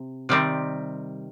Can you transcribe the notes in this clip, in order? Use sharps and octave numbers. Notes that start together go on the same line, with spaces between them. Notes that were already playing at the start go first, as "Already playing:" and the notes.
Already playing: C3
C3 D#3 G3 C4